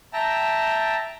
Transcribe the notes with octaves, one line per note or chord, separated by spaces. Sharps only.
E5 G5 A5 A#5